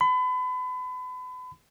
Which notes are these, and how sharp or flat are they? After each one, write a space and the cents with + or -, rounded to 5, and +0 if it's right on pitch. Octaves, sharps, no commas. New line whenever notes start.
B5 +35